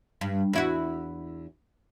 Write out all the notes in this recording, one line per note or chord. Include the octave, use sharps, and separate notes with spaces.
G2
E2 E4 F#4